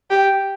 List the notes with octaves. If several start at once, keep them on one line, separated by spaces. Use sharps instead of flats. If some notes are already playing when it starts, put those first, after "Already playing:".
G4